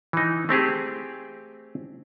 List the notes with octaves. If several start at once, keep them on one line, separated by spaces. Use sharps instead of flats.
E3 D#4
A3 C4 G4 G#4